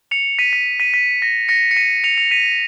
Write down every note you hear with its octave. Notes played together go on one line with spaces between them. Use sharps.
C#7 F7
B6 D#7
B6
B6 D#7
B6
A#6
A#6 C#7
C#7
B6 D#7
C#7 F7
C#7 F7
B6 D#7